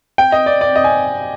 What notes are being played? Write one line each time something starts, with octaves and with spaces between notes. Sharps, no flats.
G5
D#5
D5
D5
D#5
G#5